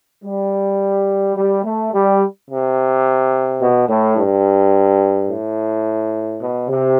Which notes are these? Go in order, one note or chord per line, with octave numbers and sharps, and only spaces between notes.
G3
G3
A3
G3
C3
B2
A2
G2
A2
B2
C3